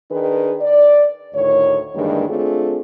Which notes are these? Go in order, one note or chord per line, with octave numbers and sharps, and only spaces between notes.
D#3 D4 G#4 B4
D5
D2 A2 D#3 C#5
G2 D#3 E3 G#3 A#3 D4
A3 C4 D4 F4 G#4